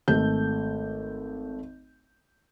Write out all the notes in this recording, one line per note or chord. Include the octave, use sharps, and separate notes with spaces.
G#1 A3 G6